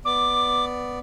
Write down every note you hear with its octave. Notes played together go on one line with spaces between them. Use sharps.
B3 D5 D6